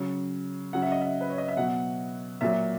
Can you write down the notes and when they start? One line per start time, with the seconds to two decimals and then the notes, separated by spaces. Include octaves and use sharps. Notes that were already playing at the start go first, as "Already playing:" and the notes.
Already playing: C#3 F#3
0.73 C#3 F#3 F#5
0.82 E5
0.92 D#5
1.01 E5
1.21 B4
1.30 C#5
1.38 D#5
1.48 E5
1.57 B2 F#3 F#5
2.41 A#2 F#3 E5